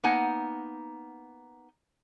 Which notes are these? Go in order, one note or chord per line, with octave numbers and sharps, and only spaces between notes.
A#3 B3 D#4 F#5 G#5